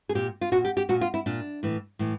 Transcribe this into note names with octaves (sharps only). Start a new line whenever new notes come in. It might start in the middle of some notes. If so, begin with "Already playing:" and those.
G#4
A#2 G4
F4
A#2 F#4
G4
G4
A#2 F#4
F4
E4
A#2 D4
A2 E3
A2 E3